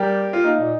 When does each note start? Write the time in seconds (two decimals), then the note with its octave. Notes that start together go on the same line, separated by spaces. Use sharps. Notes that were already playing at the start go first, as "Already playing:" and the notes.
Already playing: G3 G4 A#4
0.33 F4
0.44 A#3 D#4
0.59 A#2